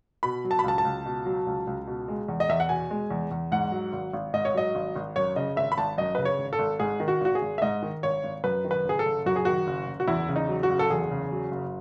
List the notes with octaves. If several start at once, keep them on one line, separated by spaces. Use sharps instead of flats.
B2 B5
F#3
A5
B5
C#2 A5
A5
C#2
B2
F#3
C#2
C#2
B2
G#3
E2
D#5
E2 E5
F#5
B2 G#5
G#3
E2
E2
G#2 F#5
F#3
G#1
G#1
G#2 D#5
C#5
F#3 D#5
G#1
G#1
F#2 C#5
C#3 D#5
G#1 E5
B5
G#1 A5
F#2 D#5
C#3 B4
C#5
G#1
A4
G#1
G#2 G#4
D#3
F#4
G#1 F#4
G#4
G#1
E5
G#2 D#5
D#3
G#1 C#5
G#1
F#2 B4
D#3
B4
F#1 G#4
A4
F#1
F#2 F#4
G#4
D#3 F#4
F#1
F#1
F#4
E2 E4
C#3
D#4
F#3
F#4
F#1
A4
E2 G#4
C#3
F#3
F#1